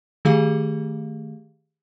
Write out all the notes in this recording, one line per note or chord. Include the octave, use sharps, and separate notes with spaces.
D#3 A3 G4 G#4 F5